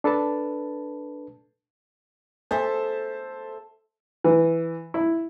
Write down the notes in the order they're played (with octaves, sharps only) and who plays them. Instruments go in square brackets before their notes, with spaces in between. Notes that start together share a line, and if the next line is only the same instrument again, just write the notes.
[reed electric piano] D4 A4 B4 A5
[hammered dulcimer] A4 E5 [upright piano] C5 A5
[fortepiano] E3
E4